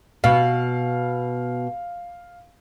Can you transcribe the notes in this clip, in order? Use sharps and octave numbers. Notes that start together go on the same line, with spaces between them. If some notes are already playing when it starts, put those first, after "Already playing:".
B2 F5